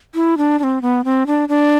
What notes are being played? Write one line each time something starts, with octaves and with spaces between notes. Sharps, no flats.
E4
D4
D4
C4
B3
C4
D4
D4